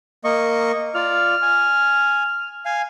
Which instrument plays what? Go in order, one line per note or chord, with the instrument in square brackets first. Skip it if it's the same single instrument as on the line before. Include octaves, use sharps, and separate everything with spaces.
[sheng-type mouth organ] A#3 D#5 C#6
[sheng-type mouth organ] F4 D5 [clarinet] F6
[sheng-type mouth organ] G#5
F5 G#5